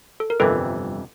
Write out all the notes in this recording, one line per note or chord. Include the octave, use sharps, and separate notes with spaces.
A4
A#4
G1 F2 C3 E3 A4 B4